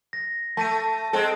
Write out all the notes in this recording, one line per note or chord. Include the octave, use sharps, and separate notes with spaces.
A#6
A3 A5 D#7
G#3 C4 A4